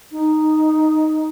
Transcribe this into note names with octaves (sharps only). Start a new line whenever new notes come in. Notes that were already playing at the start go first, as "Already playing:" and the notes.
D#4